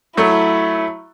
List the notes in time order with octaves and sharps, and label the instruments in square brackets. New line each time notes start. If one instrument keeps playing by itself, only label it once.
[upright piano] F#3 A3 [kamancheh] E4